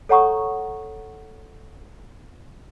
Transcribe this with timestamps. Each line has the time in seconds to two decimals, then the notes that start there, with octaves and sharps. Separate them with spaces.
0.09 A4 C#5 F#5 A#5 C#6 D#6